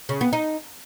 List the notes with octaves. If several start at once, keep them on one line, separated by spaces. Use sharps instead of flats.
C#3
B3
D#4